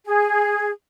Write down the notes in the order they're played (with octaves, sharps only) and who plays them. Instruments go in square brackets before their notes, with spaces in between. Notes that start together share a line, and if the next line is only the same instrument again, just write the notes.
[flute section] G#4